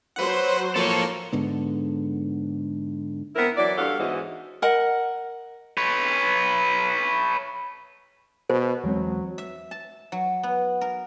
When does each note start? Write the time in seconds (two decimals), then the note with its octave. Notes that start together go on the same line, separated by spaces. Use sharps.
0.16 F#3 B4 C5 F#5
0.76 F3 A#3 A4 C#5
1.33 G#2 D3 B3
3.36 B3 C4 E4 A#4
3.57 E3 F#3 D5
3.78 G2 F#4 A4 C#5 F5
3.99 E2 G#2 E3 F#4 D#5
4.62 A#4 D#5 F#5
5.77 B4 C#5
8.50 B2 C5
8.84 E2 F#3 G#3 C4
9.38 E5
9.71 A5
10.12 F#3
10.43 B3
10.81 A#4